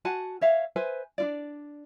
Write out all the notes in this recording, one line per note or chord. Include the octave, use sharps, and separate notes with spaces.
F#4 F#5 G#5 A5
C#5 E5 F5
B4 C5 E5 G#5
D4 F4 D5